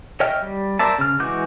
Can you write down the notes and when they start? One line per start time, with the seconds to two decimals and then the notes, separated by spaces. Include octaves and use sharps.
0.20 C#5 D#5 E5 G5 F6
0.42 G3
0.79 A#4 C5 D5 E5 A5
0.98 C#3 F6
1.20 E3 G#3 F#4 D6 G6